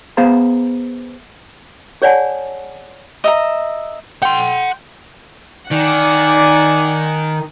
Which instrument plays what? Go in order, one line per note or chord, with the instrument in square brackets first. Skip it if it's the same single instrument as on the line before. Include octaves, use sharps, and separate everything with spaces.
[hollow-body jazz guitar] B3 G#4 C5 F5 A#5
[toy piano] G#4 C#5 D5 F#5 G#5 A5
[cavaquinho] D#5 E5 A#5
[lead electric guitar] F#5 C6 [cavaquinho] G5
[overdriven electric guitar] D#3 [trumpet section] D5 [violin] F#5 G#5